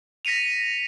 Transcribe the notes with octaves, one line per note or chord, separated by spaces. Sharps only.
A#6 B6 C#7 D#7 F7